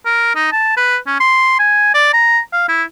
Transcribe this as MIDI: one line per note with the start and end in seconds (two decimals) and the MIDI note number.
0.05 0.35 70
0.35 0.52 63
0.52 0.73 81
0.77 0.97 71
1.07 1.18 61
1.20 1.57 84
1.59 1.93 80
1.94 2.09 74
2.13 2.39 82
2.53 2.64 77
2.68 2.83 64